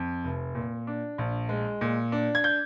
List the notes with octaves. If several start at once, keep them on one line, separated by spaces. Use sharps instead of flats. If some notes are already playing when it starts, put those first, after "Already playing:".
Already playing: F2
F1
A#2
D4
A#1
G#3
A#2
D4
G#6
G6